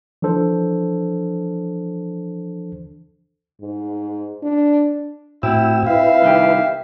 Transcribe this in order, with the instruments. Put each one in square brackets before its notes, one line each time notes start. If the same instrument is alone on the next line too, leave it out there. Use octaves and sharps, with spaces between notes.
[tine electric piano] E3 F3 D4 A4 C5
[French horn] G#2
D4
[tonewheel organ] A2 F#4 E6 [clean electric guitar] C4 [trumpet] E4
[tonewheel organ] E4 B4 [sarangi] E5 [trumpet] F5
[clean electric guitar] C2 D#3 G4